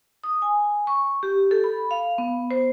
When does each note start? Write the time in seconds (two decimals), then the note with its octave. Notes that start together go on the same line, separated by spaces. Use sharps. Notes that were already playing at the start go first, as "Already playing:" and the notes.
0.24 D#6
0.42 G#5
0.87 C#6
1.23 G4
1.51 A4
1.64 B5
1.91 F5
2.18 B3
2.51 C5